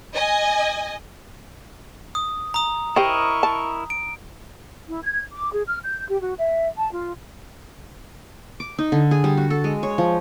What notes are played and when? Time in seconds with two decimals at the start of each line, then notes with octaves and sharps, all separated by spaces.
0.14 D#5 G#5
2.15 D#6
2.54 A#5 D#6
2.96 E4 G4 A#4 C5 D#5 G5 C#6
3.43 A5
3.90 D7
4.88 E4
5.03 G#6
5.32 D6
5.54 G#4
5.67 F6
5.84 G6
6.08 G4
6.21 F#4
6.39 E5
6.77 A5
6.92 F4
8.60 D6
8.78 D#4
8.92 D3
9.11 G#4
9.24 G3
9.37 F#4
9.50 A4
9.64 G#3
9.83 C#5
9.98 F3